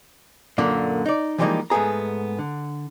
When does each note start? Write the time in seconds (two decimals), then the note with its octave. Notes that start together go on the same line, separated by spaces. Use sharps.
0.58 F#2 A#2 D3 A#3
1.06 D#4 D5
1.38 E3 F3 G3 G#3 A#3 D#4
1.70 G#2 A3 B3 G#4 A#5
2.39 D3